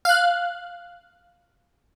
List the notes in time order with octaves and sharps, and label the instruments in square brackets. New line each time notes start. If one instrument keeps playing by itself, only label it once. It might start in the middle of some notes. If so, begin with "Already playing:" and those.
[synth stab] F5 F#6